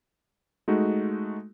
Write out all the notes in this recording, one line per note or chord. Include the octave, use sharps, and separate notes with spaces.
G#3 A3 D#4 F#4